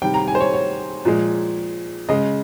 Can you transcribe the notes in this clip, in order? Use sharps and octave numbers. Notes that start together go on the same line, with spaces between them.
C3 D#3 G3 G5
A#5
G#5
C5
C#5
C#5
A#2 F3 G#3
C#3 G#3 D#5